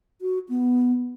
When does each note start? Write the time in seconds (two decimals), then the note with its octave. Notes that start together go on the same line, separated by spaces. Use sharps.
0.21 F#4
0.49 B3